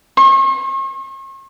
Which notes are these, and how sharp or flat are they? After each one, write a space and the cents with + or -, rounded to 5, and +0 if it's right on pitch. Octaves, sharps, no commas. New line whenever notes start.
C#6 -45